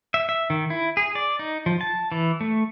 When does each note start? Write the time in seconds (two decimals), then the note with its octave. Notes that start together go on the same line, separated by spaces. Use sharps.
0.14 E5
0.29 E5
0.50 D#3
0.70 E4
0.97 G#4
1.15 D5
1.39 D#4
1.66 F3
1.81 A5
2.12 E3
2.41 A3